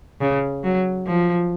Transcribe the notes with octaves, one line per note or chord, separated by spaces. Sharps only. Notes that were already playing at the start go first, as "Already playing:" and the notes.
C#3
F#3
F3